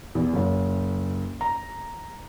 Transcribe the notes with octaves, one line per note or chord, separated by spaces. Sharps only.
E2
F#1
A#5